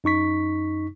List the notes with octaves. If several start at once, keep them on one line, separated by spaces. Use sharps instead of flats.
F#2 D#4 C#6 B6